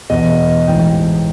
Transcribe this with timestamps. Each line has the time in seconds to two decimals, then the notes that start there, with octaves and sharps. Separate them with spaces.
0.10 E2 B2 D#5
0.67 A1 G#2 E3 G5